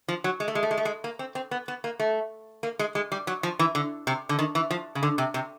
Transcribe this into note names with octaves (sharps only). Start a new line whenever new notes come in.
F3
F#3
G#3
A3
G#3
A3
G#3
A3
G#3
A#3
C4
C4
B3
B3
A#3
A3
A#3
G#3
G#3
G3
F#3
F3
E3
D3
C3
D3
D#3
E3
F3
C#3
D3
C3
C3